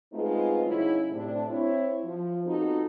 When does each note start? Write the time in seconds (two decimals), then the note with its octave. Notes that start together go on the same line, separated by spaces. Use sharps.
0.12 G#3 A3 B3 C4 D#4 F4
0.65 C#3 F#3 C#4 D#4 E4
1.11 A2 C3 D4
1.50 C4 E4 C#5
2.04 F3
2.45 B3 C4 D#4 F4 F#4 A4